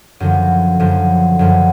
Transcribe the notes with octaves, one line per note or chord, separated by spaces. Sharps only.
F#2 D3 F3
F#2 D3 F3
F#2 D3 F3